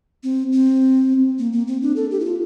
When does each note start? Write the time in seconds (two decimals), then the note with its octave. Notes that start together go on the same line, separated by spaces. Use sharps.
0.23 C4
0.52 C4
1.39 A#3
1.53 A#3
1.68 C4
1.82 D4
1.96 A4
2.11 G4
2.20 E4
2.25 F4